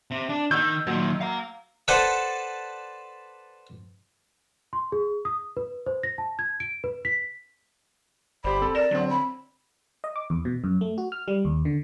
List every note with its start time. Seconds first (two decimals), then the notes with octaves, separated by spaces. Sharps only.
0.11 C3
0.29 D4
0.51 D#3 E6 G6
0.87 A#2 D#3 F#3
1.21 F5 A#5
1.88 A4 B4 C5 D5 F#5 A5
4.73 C6
4.92 G#4
5.25 D#6
5.57 B4
5.86 C5
6.03 A#6
6.18 A5
6.39 G#6
6.60 D7
6.84 B4
7.05 B6
8.44 G1 G4 C5 D5 B5
8.62 C4 A4
8.75 A#4 D5 A#6 E7
8.91 D3 F#3 C4
9.10 B5
10.04 D#5
10.16 D6
10.30 E2
10.45 B2
10.64 F#2
10.81 A3
10.98 F#4
11.12 F6
11.28 G3
11.45 D#2
11.65 D3